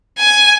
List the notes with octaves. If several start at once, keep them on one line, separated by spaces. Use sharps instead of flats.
G#5